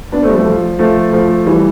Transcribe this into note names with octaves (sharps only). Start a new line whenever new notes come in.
B3 D4
A3 C4
G3
F3 A3
F3
F3 A3
F3 A3
E3 G3